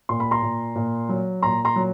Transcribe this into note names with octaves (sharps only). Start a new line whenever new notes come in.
A#2 C6
B5
A#5 C6
A#2
A#2
F#3
A#2 A#5 C6
A#5 C6
F#3